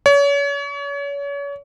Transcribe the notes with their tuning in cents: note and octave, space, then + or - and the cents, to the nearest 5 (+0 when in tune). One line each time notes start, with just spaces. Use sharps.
C#5 +35